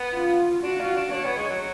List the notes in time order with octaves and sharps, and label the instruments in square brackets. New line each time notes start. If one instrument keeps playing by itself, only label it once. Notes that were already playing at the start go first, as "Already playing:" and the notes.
Already playing: [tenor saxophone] B3
[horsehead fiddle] F4
[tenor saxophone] D4 [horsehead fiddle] F#4
[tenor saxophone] F4
D4
[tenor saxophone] D4 [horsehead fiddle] C#5
[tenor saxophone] B3
G#3
F#3